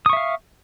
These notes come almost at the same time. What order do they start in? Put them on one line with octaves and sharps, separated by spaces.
D#6 C#6 E5 F5